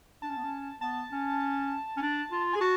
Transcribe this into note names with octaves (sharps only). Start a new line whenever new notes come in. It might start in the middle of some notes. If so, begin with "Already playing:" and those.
D4 A5
C#4
B3
C#4
B3 A5
C#4
C#4
D4
F4
G#4 G#5
F#4 A5